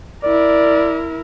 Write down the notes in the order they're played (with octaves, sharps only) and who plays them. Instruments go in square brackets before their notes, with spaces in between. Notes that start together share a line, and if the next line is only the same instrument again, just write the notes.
[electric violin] E4 A#4 [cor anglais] D5